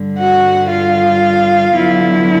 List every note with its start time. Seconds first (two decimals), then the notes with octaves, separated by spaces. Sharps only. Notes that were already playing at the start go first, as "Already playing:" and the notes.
Already playing: G2 D3 G3
0.19 F#4 F#5
0.70 F4 F5
1.73 D3 F#3 B3 E4